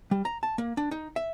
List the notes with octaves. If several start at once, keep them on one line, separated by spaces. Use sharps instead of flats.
G3
A#5
A5
A#3
D4
D#4
E5